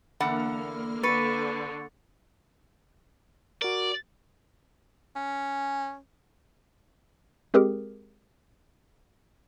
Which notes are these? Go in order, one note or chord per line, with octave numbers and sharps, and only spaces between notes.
E2 D3 A#3 F#5 B5 F6
D3 B4 C#6 A6 C#7
F#4 A#4 D5
C#4
G#3 C4 G4 G#4 A#4